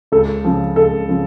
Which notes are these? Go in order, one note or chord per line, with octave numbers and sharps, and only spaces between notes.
C#2 A4
C#3 F3
C#2 A4
C#3 F3